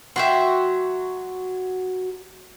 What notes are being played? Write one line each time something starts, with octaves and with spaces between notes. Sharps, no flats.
F#3 F#4 E5 G5 C6